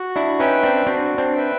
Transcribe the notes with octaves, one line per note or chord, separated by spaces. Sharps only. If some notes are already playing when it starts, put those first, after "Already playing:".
Already playing: F#4
D4 E4
C#4 D#4 B4 E5 G5
C4 D4
C4 D4 F#4
C4 D4
B4 E5 G5